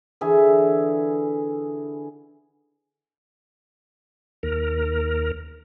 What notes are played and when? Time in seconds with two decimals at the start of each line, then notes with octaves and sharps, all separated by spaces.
0.21 D3 E3 G#4 E5
4.43 D#2 A#4